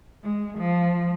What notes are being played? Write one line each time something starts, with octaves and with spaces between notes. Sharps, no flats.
G#3
F3